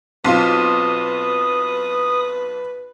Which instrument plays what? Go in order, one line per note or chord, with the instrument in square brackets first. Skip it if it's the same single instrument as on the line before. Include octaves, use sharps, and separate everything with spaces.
[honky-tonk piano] B1 C6 [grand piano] C4 F4 [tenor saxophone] B4 [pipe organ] D#6